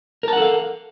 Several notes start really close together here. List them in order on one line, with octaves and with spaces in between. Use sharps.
A#4 A5 F#5 A4 F5